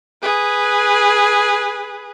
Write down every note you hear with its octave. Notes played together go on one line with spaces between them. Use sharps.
G#4 B4